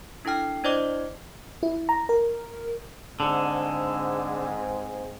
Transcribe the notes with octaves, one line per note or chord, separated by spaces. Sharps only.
D4 E4 A4 G5 F6
D4 E4 C5 D5 D#5 D6
E4
A#5
A#4
G#2 D3 C4 G#4